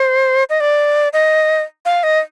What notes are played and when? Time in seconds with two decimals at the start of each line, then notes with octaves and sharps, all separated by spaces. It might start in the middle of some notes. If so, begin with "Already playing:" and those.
Already playing: C5
0.50 D#5
0.60 D5
1.13 D#5
1.85 F5
2.03 D#5